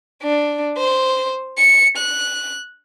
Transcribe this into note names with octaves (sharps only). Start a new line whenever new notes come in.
D4
C5
C#7
F#6